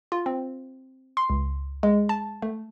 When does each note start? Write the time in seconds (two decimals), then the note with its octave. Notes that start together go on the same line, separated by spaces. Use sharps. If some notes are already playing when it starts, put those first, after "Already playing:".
0.12 F4
0.26 C4
1.17 C6
1.30 C#2
1.83 G#3
2.09 A5
2.42 A3